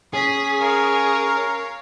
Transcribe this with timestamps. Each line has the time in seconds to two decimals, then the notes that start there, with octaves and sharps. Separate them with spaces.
0.14 C#4 G#4 D#6 B6
0.60 A#4 C#5 F5